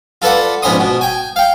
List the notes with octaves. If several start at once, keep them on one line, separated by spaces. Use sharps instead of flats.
F4 A4 B4 D5 F#5
A#1 G#2 B3 C#4 C6 D#6
B2
G5 G#5
F5 G5